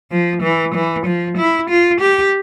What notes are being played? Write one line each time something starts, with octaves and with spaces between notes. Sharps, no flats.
F3
E3
E3
F3
E4
F4
G4